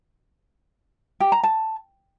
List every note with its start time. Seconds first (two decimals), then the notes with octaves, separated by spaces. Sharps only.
1.20 G4
1.32 A#5
1.43 A5